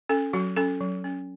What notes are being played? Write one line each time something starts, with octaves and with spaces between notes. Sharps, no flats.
C#4 A4
F#3 F#4
C#4 A4
F#3
C#4